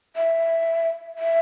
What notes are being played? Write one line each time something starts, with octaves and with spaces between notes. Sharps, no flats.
E5
E5